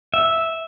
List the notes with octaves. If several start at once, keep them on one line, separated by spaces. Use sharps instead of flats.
E5